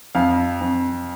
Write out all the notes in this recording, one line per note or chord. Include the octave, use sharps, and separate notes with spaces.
F2 F5
F2